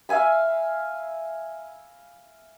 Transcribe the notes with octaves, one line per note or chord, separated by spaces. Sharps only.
E5 F5 G#5 B5